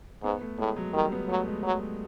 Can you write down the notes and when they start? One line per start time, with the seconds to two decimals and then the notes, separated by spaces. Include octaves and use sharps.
0.23 G#2 B3
0.41 A3
0.59 A2 G#3
0.76 F#3
0.94 D#3 G3
1.12 B3
1.29 F#3 A3
1.47 G#3
1.64 F#3